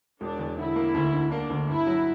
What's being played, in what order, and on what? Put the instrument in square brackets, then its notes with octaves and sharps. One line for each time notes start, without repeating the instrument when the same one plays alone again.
[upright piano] E1 [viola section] D4
[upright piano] E2
[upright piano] D3 [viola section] E4
[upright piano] A#3
D2
D3
[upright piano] A#3 [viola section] D4
[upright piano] D2
[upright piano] G2 [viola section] E4
[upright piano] F#3